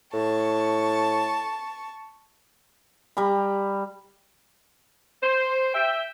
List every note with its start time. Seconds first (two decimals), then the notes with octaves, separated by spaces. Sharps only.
0.14 A2 A5 C#6
3.17 G3 A#5 B5
5.23 C5
5.74 E5 G5